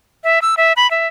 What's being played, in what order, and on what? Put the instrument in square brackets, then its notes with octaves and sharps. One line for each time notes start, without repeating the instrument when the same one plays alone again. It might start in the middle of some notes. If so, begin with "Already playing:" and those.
[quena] E5
E6
E5
B5
E5